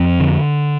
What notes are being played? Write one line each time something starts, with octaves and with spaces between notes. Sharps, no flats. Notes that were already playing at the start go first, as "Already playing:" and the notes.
Already playing: F2 C4
D3